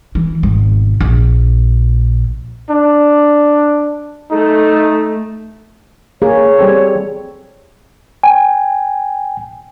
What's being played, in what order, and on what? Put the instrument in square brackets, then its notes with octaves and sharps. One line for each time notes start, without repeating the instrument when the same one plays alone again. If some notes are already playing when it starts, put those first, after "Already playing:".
[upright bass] E3
G#1 B2
A#1
[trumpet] D4
[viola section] A3 [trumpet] D#4
[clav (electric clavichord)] A#3 [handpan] G#4 [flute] C#5
[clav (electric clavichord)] G3 C4 A4
[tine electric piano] G5 G#5